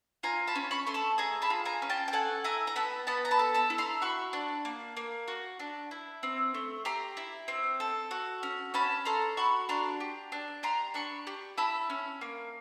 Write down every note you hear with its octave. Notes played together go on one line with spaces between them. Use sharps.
F4 G#5 A#5
A5 B5
C#4
B5 C#6
A3 C6
A5 B5
G#4 G#5 A#5
A5 B5
F4
G#5 A#5
C#4
G5 A5
G5
A4 F#5 G#5
E4 G#5 A#5
A#5
B3 A5 B5
B3 A5 B5
A#5
A5 B5
A4
A5 B5
E4
A#5 C6
F#4 B5 C#6
D4
A#3
A#3
F#4
D4
E4
C4
A3
G4 A#5 C6
E4
C4
A4
F#4
C#4
C#4 A5 B5
A4 A#5 C6
F#4 B5 C#6
D4 A#5 C6
G4
D4
G4 A#5 C6
D4 B5 C#6
G4
E4 A5 B5
C#4
A#3